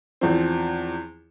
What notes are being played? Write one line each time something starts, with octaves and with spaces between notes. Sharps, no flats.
E2 F3 C4